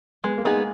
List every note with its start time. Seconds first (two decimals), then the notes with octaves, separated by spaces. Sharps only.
0.24 G#3 B3
0.38 A#3
0.45 B3 D#4 G#4
0.53 G#3